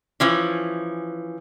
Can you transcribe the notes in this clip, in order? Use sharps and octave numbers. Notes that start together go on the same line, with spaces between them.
E3 F3 C#4